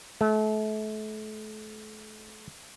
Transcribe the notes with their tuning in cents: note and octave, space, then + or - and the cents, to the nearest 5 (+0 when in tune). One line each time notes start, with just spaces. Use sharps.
A3 -35